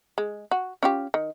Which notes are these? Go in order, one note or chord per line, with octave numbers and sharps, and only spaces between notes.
G#3
F#4
C#4 F4 G4
D#3